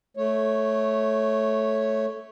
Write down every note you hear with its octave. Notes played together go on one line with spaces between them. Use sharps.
A3 C#5